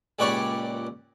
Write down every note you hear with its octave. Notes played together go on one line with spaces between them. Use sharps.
C#2 A#2 G4 B4 C#5 D5